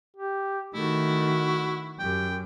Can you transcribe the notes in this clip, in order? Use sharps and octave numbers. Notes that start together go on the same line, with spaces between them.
G4
D#3 A3 E4 F#4
F#2 G4 G5